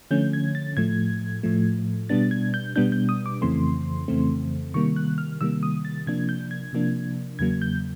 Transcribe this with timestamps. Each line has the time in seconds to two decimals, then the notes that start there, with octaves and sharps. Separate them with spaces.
0.11 D3 F3 A3 C#4 G6
0.33 G#6
0.55 A6
0.77 A2 F3 A3 G#6
1.43 A2 F3 A3
2.09 B2 G3 B3 D4 A6
2.31 G#6
2.54 G6
2.76 B2 G3 B3 D4 G6
2.92 G6
3.09 D#6
3.26 D6
3.42 F2 C#3 E3 A3 C4 C6
4.08 F2 C#3 E3 A3 C4
4.74 C3 D#3 G3 A#3 C#6
4.96 F#6
5.18 F6
5.41 C3 D#3 G3 A#3 E6
5.63 D#6
5.85 A6
6.07 C3 F3 A#3 D4 G#6
6.29 G6
6.51 G#6
6.73 C3 F3 A#3 D4
7.39 E2 C#3 F#3 A#3 G#6
7.62 G6